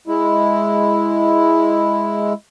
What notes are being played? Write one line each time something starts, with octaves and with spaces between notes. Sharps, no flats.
G#3 E4